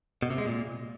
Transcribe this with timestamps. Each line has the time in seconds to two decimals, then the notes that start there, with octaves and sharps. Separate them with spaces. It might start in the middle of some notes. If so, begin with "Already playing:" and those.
0.22 B2
0.30 C3
0.38 G#3
0.46 A#2